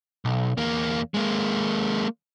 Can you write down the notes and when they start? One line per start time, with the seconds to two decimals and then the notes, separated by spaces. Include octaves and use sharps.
0.25 B1
0.57 E2 A#3
1.14 G#3 A#3